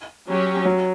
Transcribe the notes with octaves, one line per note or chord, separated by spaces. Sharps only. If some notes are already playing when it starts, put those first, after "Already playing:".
F#3 C#4 G4
F#3